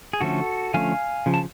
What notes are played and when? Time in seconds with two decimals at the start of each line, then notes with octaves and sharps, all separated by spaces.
0.13 G#4
0.21 D3 F3 A3 C#4 F#4 A4
0.74 D3 F3 A3 C#4 F5 G#5
1.26 C#3 F3
1.34 A5